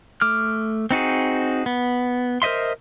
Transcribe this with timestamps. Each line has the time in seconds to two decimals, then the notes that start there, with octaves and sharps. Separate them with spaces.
0.21 A3 D6 F6
0.91 C4 D#4 F#4 G#4
1.66 B3
2.42 A#4 C5 D#5 E5 C6